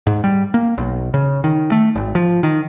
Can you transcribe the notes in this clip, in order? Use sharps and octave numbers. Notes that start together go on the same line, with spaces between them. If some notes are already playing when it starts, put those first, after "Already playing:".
G#2
G3
A#3
B1
C#3
D#3
A3
G#1
F3
D#3